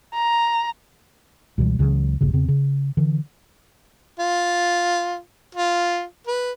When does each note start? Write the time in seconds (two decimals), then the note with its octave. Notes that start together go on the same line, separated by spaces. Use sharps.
0.14 A#5
1.58 C#2 B2 E3 G3
1.79 C#2 C#3 E3 F#3
2.21 E1 A#1 G2 C#3
2.33 E2 C#3 C4
2.48 C#3
2.97 D3 E3
4.19 F4
5.55 F4
6.27 B4